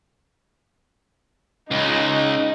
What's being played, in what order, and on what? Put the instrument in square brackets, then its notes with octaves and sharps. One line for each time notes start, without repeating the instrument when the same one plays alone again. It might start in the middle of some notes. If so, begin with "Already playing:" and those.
[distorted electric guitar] C#2 [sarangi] D#4